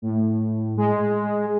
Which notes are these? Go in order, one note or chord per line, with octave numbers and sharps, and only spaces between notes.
A2
G#3